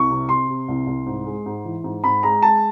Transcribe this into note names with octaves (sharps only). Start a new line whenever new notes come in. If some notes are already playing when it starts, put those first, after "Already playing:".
Already playing: C2 C#6
C3
C3 C6
C3
C2
C2
G#2
G#3
G#2
E3
G#2
G#2 B5
G#3 A#5
G#3 A5